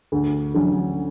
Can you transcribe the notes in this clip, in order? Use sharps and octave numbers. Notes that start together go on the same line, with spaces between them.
D2
D3 F#3 C#4